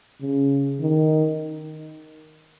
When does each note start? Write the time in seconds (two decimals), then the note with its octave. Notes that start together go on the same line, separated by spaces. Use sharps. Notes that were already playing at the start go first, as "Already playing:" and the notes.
0.21 C#3
0.80 D#3